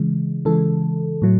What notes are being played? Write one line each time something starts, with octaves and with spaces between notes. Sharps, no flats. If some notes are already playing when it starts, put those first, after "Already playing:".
Already playing: C#3 E3 G#3
C#3 E3 G#3 A4
A2 F#3 A3